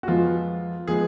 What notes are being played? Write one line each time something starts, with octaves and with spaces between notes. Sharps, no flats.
F#4
F2 F3 G#3 B3 F4
F3 G#3 B3 G#4